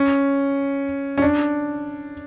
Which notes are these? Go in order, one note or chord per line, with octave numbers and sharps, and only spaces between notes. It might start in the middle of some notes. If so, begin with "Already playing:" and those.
Already playing: C#4
C#4
D4